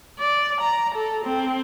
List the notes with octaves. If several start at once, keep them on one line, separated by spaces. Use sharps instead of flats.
D5
A#5
A4
C4